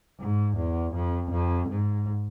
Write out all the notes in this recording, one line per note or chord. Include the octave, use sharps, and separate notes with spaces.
G#2
E2
F2
F2
G#2